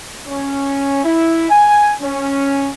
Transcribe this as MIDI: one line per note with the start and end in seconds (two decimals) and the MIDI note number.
0.28 1.03 61
1.04 1.49 64
1.50 1.93 80
2.02 2.70 61